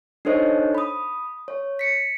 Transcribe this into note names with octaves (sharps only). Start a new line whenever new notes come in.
D4 D#4 A4 C5 C#5 D#5
B5 D#6
C#5
B6 C#7